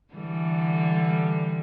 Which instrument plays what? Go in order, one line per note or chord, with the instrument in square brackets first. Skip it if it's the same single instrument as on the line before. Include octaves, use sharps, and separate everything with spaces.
[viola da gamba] D3 E3 G3